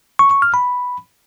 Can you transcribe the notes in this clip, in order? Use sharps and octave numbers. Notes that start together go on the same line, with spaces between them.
C#6
C#6
F6
B5